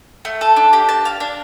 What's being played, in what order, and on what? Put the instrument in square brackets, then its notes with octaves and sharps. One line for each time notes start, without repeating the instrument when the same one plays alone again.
[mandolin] A3
A4
D4
G4
A5
F5
D4